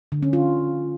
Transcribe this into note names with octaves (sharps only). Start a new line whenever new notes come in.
D3
C#4
F4